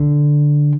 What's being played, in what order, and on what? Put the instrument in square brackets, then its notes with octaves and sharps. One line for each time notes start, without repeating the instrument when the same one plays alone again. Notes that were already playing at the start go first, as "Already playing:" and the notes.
Already playing: [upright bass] D3